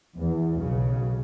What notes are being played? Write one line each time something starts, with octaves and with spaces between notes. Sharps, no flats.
E2
B1 C#3